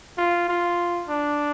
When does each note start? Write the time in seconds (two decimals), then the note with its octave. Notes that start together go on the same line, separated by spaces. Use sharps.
0.18 F4
0.48 F4
1.08 D4